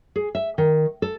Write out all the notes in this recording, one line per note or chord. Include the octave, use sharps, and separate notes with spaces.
G#4
E5
D#3
A4